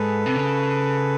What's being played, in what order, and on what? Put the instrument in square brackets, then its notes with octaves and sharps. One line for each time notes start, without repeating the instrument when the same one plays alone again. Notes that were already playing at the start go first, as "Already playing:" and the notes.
Already playing: [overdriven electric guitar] G#2 [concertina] A4 B4
[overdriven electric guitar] C3
C#3